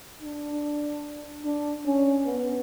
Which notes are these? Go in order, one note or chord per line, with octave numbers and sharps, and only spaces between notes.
D4
D4
C#4
B3